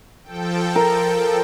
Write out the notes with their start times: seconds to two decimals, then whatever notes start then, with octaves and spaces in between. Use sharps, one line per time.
0.23 F3 A4 G5
0.76 A#4